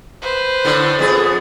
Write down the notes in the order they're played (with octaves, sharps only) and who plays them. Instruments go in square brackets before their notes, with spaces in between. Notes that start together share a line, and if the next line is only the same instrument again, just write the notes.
[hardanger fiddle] B4 C5
[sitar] A2 D3
F2 B3 G#4